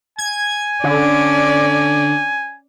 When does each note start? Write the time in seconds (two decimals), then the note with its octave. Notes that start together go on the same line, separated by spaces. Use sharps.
0.18 G#5 G#6
0.84 D3 C#4 D5